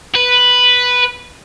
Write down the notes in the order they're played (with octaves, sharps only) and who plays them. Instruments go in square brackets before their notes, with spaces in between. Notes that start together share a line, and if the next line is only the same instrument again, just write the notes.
[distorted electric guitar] B4